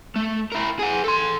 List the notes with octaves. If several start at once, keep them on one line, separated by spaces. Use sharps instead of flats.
A3
E4 A#4
G#4 F#5
A4 C6